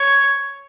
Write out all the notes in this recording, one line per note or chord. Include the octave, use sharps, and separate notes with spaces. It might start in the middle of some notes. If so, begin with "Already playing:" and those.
Already playing: C#5